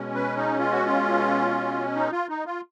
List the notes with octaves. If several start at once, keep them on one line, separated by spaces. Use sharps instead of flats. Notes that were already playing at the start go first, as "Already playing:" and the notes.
Already playing: B2 G#3 C#4
B4
D#4
F4
F#4
F4
D#4
F4
D#4
F4